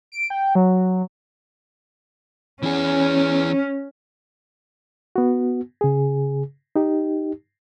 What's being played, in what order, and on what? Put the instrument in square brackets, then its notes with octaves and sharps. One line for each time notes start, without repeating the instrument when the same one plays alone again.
[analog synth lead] D7
G5
F#3
[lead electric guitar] E3 G#4 [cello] C#4
[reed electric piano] B3 F#4
C#3 G#4
D#4 G4